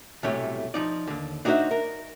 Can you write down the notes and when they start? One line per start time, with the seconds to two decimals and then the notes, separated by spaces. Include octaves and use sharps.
0.23 B1 A2 C3 G3 A3 C#5
0.74 F3 D#4 D5
1.08 D#2 D3
1.45 D4 D#4 F#4 G#4 C5 E5
1.71 A#4